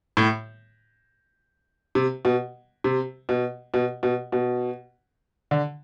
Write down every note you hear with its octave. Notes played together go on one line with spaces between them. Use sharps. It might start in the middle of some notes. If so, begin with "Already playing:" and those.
A2
C3
B2
C3
B2
B2
B2
B2
D3